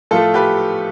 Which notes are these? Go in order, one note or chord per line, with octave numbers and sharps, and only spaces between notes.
A2 F3 A3 F4 A4
G4 B4